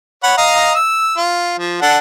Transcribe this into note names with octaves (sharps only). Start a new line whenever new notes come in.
C#5 F#5 B5
D#5 F5 A#5
E6
F4
F3
D4 A4 F#5